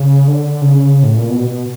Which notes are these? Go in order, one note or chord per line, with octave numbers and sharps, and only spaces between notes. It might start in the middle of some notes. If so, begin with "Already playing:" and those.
Already playing: C#3
D3
C#3
A2
A#2
B2